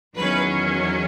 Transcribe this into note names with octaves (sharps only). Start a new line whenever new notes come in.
E2 D#3 F#3 C#4 B4